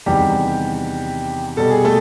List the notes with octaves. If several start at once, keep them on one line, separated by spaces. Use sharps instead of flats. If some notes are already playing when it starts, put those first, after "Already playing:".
E2 C3 D#3 G3 G4
B2 G3 A4
G#4
A3 A4